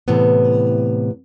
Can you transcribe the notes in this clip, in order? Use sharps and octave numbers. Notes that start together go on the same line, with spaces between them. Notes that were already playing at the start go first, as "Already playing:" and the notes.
A2 C3 E3 B3